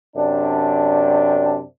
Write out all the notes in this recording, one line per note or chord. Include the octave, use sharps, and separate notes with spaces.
F#2 C3 D4